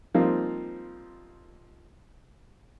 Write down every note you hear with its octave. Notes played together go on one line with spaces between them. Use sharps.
F3 G3 A#3 C4 D#4